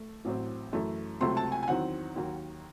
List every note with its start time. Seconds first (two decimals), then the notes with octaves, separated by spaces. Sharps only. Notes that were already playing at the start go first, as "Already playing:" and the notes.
Already playing: A3
0.25 A1 A2 F#3 C4
0.73 F#2 E3 A3
1.21 C#2 C3 F#3 A3 C4 C6
1.37 A5
1.52 G#5
1.63 G#5
1.68 E2 D#3 F#3 C4 F#5
2.16 D#2 D#3 F#3